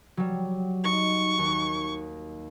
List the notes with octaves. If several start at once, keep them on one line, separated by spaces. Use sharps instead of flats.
F#3 G3
D#4 C#6
D#2